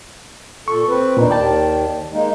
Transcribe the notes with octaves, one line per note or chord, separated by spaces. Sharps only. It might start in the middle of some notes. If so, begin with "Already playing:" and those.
A#2 A4 C#6
C4 B4
E2 A#2 D4 D#4
D#2 D#3 D5 G5 A5
G#3 A#3 D#4